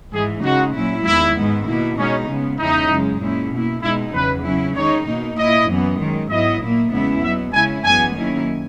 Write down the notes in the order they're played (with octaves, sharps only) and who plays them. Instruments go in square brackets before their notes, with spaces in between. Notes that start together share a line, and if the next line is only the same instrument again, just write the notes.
[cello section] G#2 E3 G#3 [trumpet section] G#4
[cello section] C#3 G#3 D#4 [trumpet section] F#4
[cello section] A#2 F#3 C#4 E4
[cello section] E2 D#3 G#3 [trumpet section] E4
[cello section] G#2 D#3 G#3 B3
B2 A#3 E4
[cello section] B2 G#3 B3 D#4 [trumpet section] C#4
[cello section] C#3 G#3 B3
[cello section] E2 C#3 G#3 C#4 E4 [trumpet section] D#4
[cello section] F#2 C#3 G#3
A#2 G#3 C#4 E4
B2 A#3 E4
[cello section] B2 G#3 D#4 [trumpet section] E4
[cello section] E2 C#3 F#3 [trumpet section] B4
[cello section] C#3 F#3 C#4 E4
[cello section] D#3 G#3 D#4 [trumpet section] C#5
[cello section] B2 A#3 D#4
[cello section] A#2 A#3 E4 [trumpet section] D#5
[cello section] F#2 E3 B3
F#2 D#3 G#3
[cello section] G#2 F#3 B3 E4 [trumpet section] D#5
[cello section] A#2 A#3 E4
E2 C#3 G#3 B3 E4
[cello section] B2 F#3 B3 [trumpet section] E5
[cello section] C#3 G#3 C#4 E4 [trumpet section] G#5
[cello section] F#2 E3 G#3 B3 [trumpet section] G#5
[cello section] F#2 D#3 A#3 C#4 E4